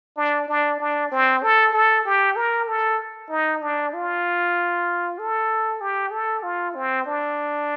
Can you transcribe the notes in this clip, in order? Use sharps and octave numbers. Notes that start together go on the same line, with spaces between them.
D4
D4
D4
C4
A4
A4
G4
A#4
A4
D#4
D4
F4
A4
G4
A4
F4
C4
D4